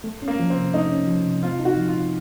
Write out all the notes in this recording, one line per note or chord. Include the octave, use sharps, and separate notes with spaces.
A3
C#4
A#3
F3
C4
C3
A3 D#4
C#4
F3
C3
C4 F4
D#4
F#4
F3
F4
A#2